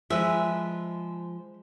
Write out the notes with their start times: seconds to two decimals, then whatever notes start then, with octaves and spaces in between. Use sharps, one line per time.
0.10 F3 G#3 B4 E5